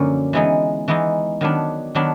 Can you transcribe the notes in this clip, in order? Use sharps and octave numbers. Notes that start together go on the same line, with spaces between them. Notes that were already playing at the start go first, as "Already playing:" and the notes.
Already playing: F#2 D3 F3 A#3 C#4
E3 G#3 B3 D#4
E3 G#3 B3 D#4
D#3 F#3 B3 D4
D#3 F#3 B3 D4